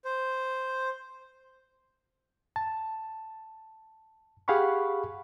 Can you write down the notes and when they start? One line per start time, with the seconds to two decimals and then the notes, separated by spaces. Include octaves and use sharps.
0.05 C5
2.56 A5
4.48 G4 G#4 F5 F#5 B5 C#6